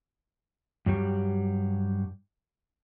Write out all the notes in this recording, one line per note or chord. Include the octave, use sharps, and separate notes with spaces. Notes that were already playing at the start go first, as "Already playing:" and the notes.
G2 F#3 G3